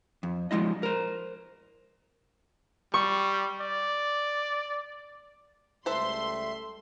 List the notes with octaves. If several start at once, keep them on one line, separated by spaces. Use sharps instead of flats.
F2
F3 G#3 E4 D#5
A#4 C5
G3 C#6
D5
C#2 G3 A3 A4 B4 C5 E5 C6